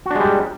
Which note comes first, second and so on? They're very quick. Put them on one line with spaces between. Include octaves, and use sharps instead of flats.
F#4 D4 G#3 G3